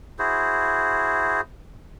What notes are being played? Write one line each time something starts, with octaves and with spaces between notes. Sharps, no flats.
E4 F#4 G#4 C5